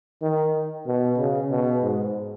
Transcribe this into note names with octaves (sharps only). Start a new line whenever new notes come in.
D#3
B2
C#3
B2
G#2